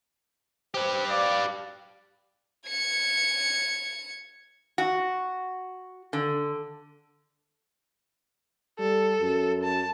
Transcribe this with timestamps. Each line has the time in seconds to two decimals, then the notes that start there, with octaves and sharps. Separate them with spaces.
0.74 G4 B4 C5
1.10 D5 F5
2.69 G#6 C#7
4.78 F#4
6.13 D3
8.79 G3 A4
9.21 F#2
9.63 A5